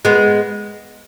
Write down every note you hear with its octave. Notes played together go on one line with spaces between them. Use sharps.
G#3 B3